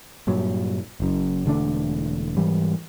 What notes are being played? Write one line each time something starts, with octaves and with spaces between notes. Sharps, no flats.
G2 A#2 F#3
F#1 F#2
E1 D3 A3 D4
G#2 E3 G3